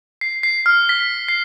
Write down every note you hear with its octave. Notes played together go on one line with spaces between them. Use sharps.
C7
C7
F6
B6
C7